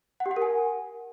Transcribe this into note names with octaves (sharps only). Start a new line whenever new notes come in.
F#5
G4
F#5
A#4
G#5